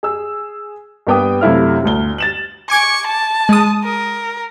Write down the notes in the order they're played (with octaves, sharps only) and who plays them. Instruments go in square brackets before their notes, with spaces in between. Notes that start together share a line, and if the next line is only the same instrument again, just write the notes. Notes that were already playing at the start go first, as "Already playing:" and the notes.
[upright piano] G#4 E6
G2 A#3 B3 G5 D6 D#6
F#2 C3 A3 E4 F5 F6
G1 D2 G7
A6 E7 F#7
[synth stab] G#5 D6 G#6 [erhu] C#6
[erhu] A5
[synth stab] G#3 D#6
[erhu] A#4